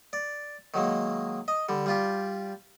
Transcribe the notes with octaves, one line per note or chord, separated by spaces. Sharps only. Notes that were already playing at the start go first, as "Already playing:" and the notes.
D5
D#3 F#3 G#3 A#3
D#5
D3 G3
G3 F4 G4